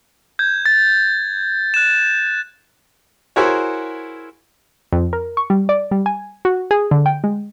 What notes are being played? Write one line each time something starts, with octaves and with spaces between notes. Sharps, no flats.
G6 G#6
A6
F#6 E7
E4 F#4 G#4 A#4 C5 C#5
F2
A#4
C#6
G3
D5
G3
G#5
F#4
G#4
D3
G5
G#3